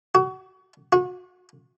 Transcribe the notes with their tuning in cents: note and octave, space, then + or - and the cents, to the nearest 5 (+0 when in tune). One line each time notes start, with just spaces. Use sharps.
F#4 +30
F#4 -30